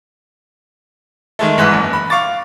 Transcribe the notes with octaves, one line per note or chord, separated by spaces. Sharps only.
D#3 G#3 A3
G1 G#2 E3 F#6
F#1
B5
F5 C#6 D6 A6